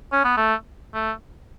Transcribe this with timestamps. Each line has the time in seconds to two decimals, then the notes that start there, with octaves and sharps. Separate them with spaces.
0.12 C#4
0.24 B3
0.37 A3
0.94 A3